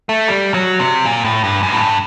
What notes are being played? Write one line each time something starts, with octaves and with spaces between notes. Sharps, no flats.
A3
G3
F#3
C3
A#2
A2
G2
F#2
A2
G2